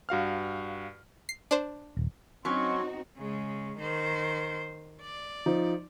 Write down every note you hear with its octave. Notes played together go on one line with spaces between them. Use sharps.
G2 F#4 F5 F6
C7
D4 C5
D#1
F#3 C4 C#4 D#4 F#4 C6 C#6
C#3 G#3
D#3 C5
D5
F3 D#4